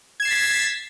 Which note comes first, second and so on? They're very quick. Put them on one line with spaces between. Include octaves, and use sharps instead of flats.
G#6 E7 C7 A6 B6